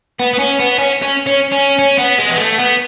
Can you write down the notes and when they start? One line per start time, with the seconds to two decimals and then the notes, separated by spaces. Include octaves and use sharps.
0.19 B3
0.33 B3
0.39 C#4
0.59 B3
0.78 C#4
1.03 C#4
1.27 C#4
1.52 C#4
1.79 C#4
1.98 B3
2.19 G#3
2.30 B3
2.38 A3
2.58 B3